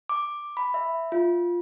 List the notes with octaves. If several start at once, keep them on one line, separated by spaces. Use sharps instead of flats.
D6
B5
E5
F4